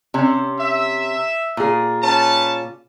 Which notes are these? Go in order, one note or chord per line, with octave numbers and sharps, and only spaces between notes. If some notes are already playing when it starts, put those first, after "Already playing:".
C3 C#4
E5
A#2 G#4
C#4 B4 A5